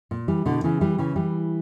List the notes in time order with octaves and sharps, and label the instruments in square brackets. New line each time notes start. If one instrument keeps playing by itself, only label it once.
[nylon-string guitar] A#2
E3 G3
B2 D3
C#3 E3
E3 G3
C#3 E3
E3 G3